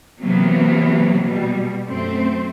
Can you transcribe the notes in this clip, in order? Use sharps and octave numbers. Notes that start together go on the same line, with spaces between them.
C3 E3 F#3 A#3 B3
B2 G3
F#2 A3 C4 C5